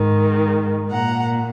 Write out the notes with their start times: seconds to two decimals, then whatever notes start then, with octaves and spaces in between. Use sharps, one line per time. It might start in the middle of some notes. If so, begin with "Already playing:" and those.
Already playing: G#2 D#3
0.92 A#2 F#5 A#5